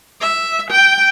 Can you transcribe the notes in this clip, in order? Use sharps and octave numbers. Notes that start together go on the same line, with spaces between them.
E5
G5